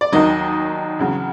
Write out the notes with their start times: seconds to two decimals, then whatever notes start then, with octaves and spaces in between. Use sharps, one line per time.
0.01 D5
0.12 D#2 D#3 F#3 D#5
0.99 E2 C#3 F#3